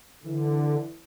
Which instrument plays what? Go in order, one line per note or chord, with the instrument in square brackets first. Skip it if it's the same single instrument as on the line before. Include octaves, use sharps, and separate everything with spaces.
[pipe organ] D3 [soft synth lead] E3